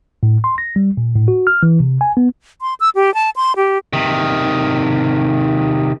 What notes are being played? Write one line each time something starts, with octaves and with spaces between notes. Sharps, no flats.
A2
C6
A#6
G3
A#2
A2
F#4
F6
E3
C3
G#5
B3
C6
E6
G4
A5
C6
G4
C3 D#3